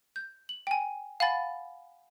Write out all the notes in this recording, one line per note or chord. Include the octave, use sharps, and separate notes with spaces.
G6
F#7
G5 G#5
F5 F#5 G#5 B5 A6